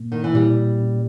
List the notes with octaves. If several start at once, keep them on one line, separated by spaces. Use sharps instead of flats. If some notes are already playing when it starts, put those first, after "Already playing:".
Already playing: A#2 A#3
D#3
E3
A#2 G3
C#4